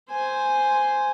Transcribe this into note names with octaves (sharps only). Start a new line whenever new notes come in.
C5 G#5